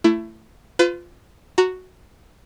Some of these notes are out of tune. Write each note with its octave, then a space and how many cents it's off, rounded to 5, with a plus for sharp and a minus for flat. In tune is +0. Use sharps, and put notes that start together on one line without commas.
A3 +15 E4 +25
F4 +0 B4 +40
F#4 +0 A#5 -15